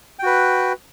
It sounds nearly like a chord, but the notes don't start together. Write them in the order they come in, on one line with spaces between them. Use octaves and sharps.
G5 F#4 B4